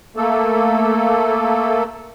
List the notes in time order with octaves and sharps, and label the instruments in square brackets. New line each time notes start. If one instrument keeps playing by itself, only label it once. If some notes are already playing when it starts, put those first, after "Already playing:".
[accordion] A3 A#3 A4